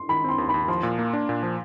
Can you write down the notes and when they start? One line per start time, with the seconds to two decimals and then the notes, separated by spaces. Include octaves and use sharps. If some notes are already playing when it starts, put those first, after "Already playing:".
Already playing: C6
0.09 D#3 B5
0.24 C4 C6
0.38 D#2
0.49 B5
0.54 D#2
0.68 F3 C6
0.83 A#2
0.99 A#3
1.13 D4
1.29 A#2
1.43 F3